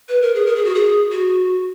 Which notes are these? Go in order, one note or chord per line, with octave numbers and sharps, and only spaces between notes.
B4
A#4
G#4
A#4
G#4
F#4
G#4
F#4